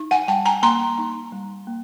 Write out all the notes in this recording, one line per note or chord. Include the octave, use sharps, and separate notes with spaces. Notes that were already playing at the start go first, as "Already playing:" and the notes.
Already playing: D#4
F#5 G#5
G3 G5 A5
G#5 A#5
A#3 A#5 C6
D#4
G3
A#3